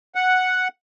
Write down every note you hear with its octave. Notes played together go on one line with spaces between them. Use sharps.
F#5